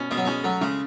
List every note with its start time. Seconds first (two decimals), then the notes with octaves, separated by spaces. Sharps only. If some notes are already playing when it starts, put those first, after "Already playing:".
Already playing: B2 C#4
0.11 B2 G#3
0.17 F#3
0.25 G#3 C#4
0.44 F#3 A3
0.61 C#3 G#3